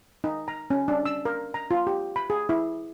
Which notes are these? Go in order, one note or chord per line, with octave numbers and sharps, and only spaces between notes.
D#4
A#5
C#4
D4
E6
A#4
A#5
F4
G4
B5
G#4
E4